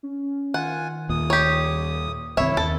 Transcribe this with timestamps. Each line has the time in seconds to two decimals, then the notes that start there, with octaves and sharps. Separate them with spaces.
0.03 C#4
0.54 D#3 F4 F#5 G#5
1.10 D#2 A#2 D#6
1.30 G4 C#5
2.37 G1 C2 D#3 C4 E4 C#5 E5
2.57 D#2 A4